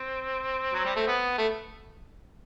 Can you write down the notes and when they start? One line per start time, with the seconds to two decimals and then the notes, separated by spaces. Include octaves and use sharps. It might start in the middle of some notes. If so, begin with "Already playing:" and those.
Already playing: C4
0.73 F#3
0.85 G3
0.96 A3
1.07 B3
1.38 A3